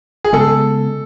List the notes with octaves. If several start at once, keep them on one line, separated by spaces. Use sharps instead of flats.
G#4
C#3 G#3 B3 A4